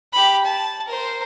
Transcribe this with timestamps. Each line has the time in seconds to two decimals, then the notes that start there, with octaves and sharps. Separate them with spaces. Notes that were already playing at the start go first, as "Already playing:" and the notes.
0.13 G4 B5
0.45 A5
0.87 A#4 C5